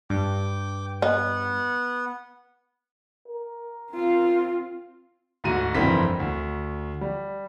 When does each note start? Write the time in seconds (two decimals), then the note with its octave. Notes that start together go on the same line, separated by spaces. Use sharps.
0.10 G2 G5 D6
1.02 B3 D#4 F#5
3.28 A#4
3.92 C4 F4
5.44 D2 G#2 F#4 D#7
5.75 F1 G2 D#3 E3 C4 B6
6.20 D2
7.01 G3